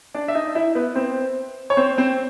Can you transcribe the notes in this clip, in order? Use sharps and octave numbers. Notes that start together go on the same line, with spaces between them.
D4 D5
E5
D#4 D#5
E4 E5
B3 B4
C4 C5
C#5
C4 C5
C4 C5